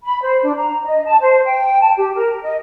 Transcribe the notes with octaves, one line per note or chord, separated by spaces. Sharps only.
B5
C5
D4
A#5
D#5
A5
C5
G5
A5
G4
A#4
D#5